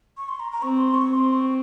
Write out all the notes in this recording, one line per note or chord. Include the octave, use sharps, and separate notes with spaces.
C#6
C6
A#5
A#5
C4 C#6
C6
C#6
C4 C6 C#6
C#6